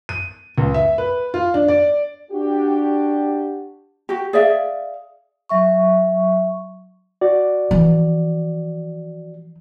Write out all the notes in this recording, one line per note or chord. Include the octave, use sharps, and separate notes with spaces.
D#7
C#2
E5
B4
F4
D4
D5
D4 F#4 G4
F#4 G4
G#4 D5 E5 F5
F#3 E5 C#6
F#4 D5
E3 F3